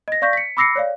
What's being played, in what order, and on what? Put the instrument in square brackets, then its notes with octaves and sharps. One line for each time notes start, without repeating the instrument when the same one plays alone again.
[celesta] D#5 A#6
D5 F5 C#6 G6 A#6 B6
B6 C#7
B5 D6 E6 A#6 C7 C#7
C#5 D5 F5